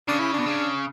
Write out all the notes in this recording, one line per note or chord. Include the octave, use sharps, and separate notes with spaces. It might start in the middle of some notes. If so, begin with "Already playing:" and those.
C#3 D4
E4
D4
B2
C#3